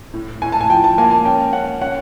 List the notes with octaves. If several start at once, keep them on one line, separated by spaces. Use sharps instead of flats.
A2
A2 G#5
A5
G#5
F3 G5
A5
A#3 G#5
A5
C#4 G5
C#4 F#5
C#4 F#5